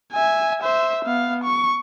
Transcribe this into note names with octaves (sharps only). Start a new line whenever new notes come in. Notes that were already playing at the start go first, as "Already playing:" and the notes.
E5 G#5
C5 E5
B3 F5
C#6